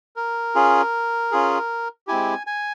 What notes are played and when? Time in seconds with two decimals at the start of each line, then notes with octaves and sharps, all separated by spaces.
0.16 A#4
0.55 C#4 F4 G#4
1.32 C#4 F4 G#4
2.07 G#3 C4 E4 G4 G#5
2.47 G#5